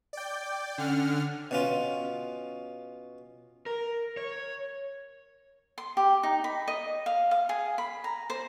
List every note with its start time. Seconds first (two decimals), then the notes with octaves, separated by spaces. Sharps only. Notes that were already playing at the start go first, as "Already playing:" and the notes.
0.13 D5 G5
0.78 D3 C#4 F#5 F6
1.51 B2 C#4 F4
3.66 A#4
4.17 C#5
5.78 C6
5.97 G4
6.23 D#4
6.44 B5
6.68 D#5
7.06 F5
7.31 F5
7.49 G#4
7.78 B5
8.04 A#5
8.30 C5